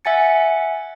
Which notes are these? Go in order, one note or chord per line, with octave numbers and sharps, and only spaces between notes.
E5 F#5 G#5 A6 C#7